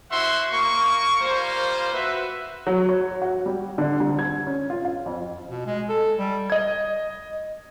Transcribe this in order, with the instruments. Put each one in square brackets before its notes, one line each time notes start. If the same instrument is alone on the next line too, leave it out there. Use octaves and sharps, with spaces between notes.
[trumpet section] E4 F#4 C5 E5 F#5 C6
A#3 C#6
G3 A#3 F4 C5
F#4 B4 E5
[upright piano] F#3
C#5
F#4
G3
D3
C2
G#6
C#4
F4
F5
F2
[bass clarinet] B2
G#3
A4
G3
[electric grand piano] D#5 G#6